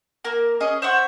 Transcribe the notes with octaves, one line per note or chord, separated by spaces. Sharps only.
A#3 A#4
C#4 G#4 D#5
C5 E5 F#5 C#6